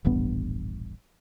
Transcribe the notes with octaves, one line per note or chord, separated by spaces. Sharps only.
D#1 A1 G2 B3